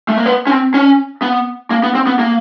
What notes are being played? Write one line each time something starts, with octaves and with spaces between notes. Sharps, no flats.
A3
A#3
B3
C#4
C4
C#4
B3
A#3
B3
C4
B3
A#3